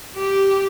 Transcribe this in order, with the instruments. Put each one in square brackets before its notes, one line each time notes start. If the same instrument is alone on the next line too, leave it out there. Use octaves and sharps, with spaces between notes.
[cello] G4